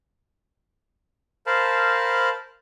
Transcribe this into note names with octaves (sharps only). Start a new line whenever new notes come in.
A#4 C5 F5 A5 B5